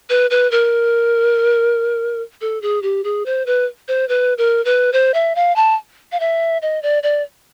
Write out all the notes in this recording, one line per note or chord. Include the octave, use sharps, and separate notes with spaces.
B4
B4
A#4
A4
G#4
G4
G#4
C5
B4
C5
B4
A#4
B4
C5
E5
F5
A5
F5
E5
D#5
D5
D5